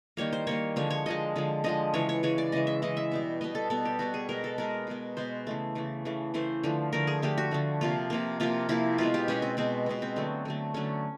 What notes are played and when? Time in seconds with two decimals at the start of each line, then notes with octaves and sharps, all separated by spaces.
0.17 D#3 G3 A#3 C#5
0.33 C5
0.47 D#3 G3 A#3 C#5
0.76 D3 F3 G#3 C#5
0.91 C#5
1.06 D3 F3 G#3 D#5
1.36 D3 F3 G#3
1.64 D3 F3 G#3 D#5
1.94 C#3 E3 G#3 C#5
2.09 C#5
2.23 C#3 E3 G#3 C#5
2.38 D5
2.52 C#3 E3 G#3 D#5
2.67 E5
2.82 C#3 E3 G#3 D#5
2.97 E5
3.11 B2 G3 B3
3.41 B2 G3 B3 D#5
3.55 A4
3.70 B2 G3 B3 A4
3.85 G4
3.99 B2 G3 B3 F#4
4.14 G#4
4.29 B2 G#3 B3 A#4
4.44 A4
4.58 B2 G#3 B3 A#4
4.87 B2 G#3 B3
5.17 B2 G#3 B3 C5
5.47 C#3 E3 A3
5.75 C#3 E3 A3
6.05 C#3 E3 A3
6.34 C#3 E3 A3 C5
6.64 D3 F3 A3
6.93 D3 F3 A3 A#4
7.07 G#4
7.22 D3 F3 A3 G4
7.38 F#4
7.51 D3 F3 A3
7.81 C3 F3 A#3 F4
8.10 C3 F3 A#3
8.40 C3 F3 A#3 F4
8.69 C3 F3 A#3 E4
8.98 B2 G#3 B3 F4
9.14 G4
9.28 B2 G#3 B3 C#4
9.42 C4
9.57 B2 G#3 B3 C4
9.86 B2 G#3 B3
10.02 C4
10.16 D3 F#3 A3
10.45 D3 F#3 A3
10.74 D3 F#3 A3 C#4